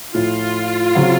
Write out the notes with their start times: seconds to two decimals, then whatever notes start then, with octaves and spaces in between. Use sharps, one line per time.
0.14 A2 F3 A3 F4
0.95 C#3 F#3 C4 F#4